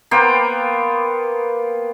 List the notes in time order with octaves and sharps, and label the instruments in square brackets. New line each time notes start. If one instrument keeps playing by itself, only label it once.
[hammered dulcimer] A#3 B3 C5 G5